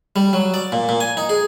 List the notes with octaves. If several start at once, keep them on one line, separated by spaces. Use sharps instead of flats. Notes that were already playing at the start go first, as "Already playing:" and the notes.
G3
F#3
D5
A#2
A#2
G#5
D#4
G#4